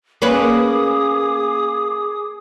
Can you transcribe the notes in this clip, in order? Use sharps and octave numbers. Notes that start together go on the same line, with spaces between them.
A#3 C#4 G#4 B4 D6 D#6